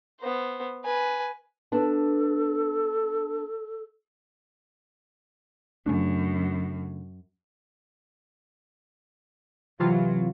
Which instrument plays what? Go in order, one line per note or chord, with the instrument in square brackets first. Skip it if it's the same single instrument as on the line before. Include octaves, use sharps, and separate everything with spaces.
[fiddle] B3 C5
B4 G#5
[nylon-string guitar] B3 D4 A5 [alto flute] A4
[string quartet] F#2 [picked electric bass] C#3 A3 D4
[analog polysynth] C3 E3 F4 [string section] F#3